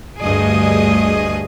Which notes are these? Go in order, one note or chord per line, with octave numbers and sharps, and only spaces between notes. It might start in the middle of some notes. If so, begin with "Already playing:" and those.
D2 G2 A3 G#4 D#5